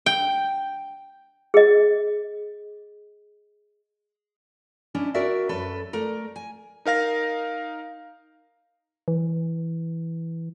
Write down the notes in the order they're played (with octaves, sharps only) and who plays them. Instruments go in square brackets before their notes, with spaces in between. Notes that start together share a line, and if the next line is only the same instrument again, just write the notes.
[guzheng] G5
[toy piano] G#4 D#5
[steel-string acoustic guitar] C#4 D4 E4 D#5
F#4 A#4 D5 E5
F#2 A4 B4
A3 A#4 D5
G#5
[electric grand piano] D#4 A#4 F5 A#6
[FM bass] E3